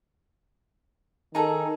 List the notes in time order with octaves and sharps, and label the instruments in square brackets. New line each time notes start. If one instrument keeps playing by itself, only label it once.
[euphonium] D#3 [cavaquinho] D#4 G#4 A4